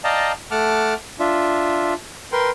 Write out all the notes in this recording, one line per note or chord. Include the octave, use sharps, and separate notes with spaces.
D5 D#5 F5 G5 A5 A#5
A3 F#5 A5 D6 F6
D4 F4 E5
A#4 B4 G5 C6